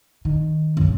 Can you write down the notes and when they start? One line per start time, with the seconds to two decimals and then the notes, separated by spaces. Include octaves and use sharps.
0.25 D#3
0.77 B1 F#2